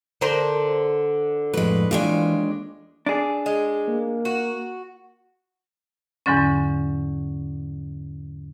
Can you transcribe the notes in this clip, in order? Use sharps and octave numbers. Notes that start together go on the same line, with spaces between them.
D3 A#4 C5
F2 A2 G#3 B4
D#2 E3 G#3 D4 F4
D4 G#4
G#3
A#3
F#4
E2 G#2 D3 F#3 C#4